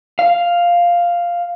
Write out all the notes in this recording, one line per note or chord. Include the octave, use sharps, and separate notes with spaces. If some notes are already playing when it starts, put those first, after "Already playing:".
F5